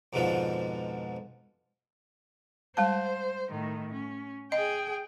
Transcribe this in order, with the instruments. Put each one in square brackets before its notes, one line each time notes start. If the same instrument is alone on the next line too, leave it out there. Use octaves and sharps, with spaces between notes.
[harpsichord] F2 G#2 B2 D3 F3
[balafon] G3 G#3 A5 [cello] C5
[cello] A2 D#3
C#4
[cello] G#4 G5 [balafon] D#5